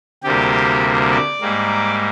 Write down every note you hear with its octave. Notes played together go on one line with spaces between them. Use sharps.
D2 C3 G3 A#3 G4
D5
G#2 G3 A#3